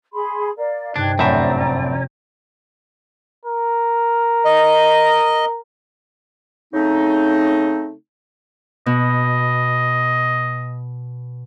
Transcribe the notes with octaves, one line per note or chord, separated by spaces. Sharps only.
G#4 B5 C6
A#4 D5 F5
G2 C3 D4 D#4 F#6 G#6
F1 F#2 A2 C4 D5 E5 A#5
A#4
D#5
C#3 A3 C4 D#4
B2 D#5